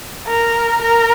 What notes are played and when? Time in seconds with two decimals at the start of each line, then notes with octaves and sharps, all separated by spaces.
0.27 A#4
0.81 A#4